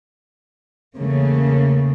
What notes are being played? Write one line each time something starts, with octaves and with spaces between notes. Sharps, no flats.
E2 C#3 A3 A#3